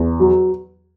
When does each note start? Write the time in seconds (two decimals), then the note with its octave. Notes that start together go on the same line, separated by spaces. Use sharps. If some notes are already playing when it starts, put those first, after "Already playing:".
Already playing: E2
0.20 F#3